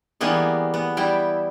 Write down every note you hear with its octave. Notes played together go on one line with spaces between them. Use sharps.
E3 G3 A#3 B3 G#4
B3
G3 E4 G5